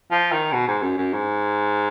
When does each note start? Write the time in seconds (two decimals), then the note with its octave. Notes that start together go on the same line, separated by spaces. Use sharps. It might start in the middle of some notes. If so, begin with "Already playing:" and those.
0.11 F3
0.32 D#3
0.52 B2
0.68 G#2
0.83 F#2
0.97 F#2
1.13 G#2